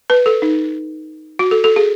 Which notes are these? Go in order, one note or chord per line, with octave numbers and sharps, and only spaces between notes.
B4
A4
D#4
F#4
A4
A4
G#4